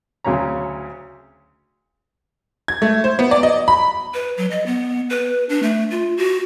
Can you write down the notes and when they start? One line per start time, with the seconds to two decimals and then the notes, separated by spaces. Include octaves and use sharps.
0.24 D2 C#3 F#3 C#4 A#5
2.68 G#6
2.82 A3
3.04 C5
3.19 B3
3.31 D5
3.43 D#5
3.68 B5
4.14 B4
4.38 F#3
4.51 D#5
4.66 B3
5.10 B4
5.49 D4
5.63 A3
5.91 F4
6.18 F#4